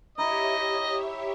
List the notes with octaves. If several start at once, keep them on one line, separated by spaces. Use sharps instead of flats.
D#4 E4 G4 C#5 D#5 E5